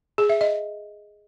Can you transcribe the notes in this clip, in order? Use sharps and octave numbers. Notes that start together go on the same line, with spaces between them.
G#4
E5
D#5